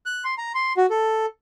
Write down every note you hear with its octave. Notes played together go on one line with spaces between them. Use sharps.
F#6
C6
A#5
C6
F#4
A4